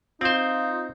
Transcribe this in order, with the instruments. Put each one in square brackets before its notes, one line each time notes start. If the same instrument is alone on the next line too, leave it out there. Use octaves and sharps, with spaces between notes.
[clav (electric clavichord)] C4 C5 [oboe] D#4 [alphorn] F4